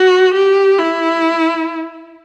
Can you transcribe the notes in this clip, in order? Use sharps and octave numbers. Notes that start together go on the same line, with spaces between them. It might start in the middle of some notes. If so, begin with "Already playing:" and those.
Already playing: F#4
G4
E4